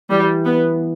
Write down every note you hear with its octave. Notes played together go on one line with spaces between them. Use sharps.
E3 G3
B3